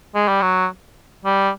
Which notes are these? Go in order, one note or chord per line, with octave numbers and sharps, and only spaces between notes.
G#3
G3
F#3
G3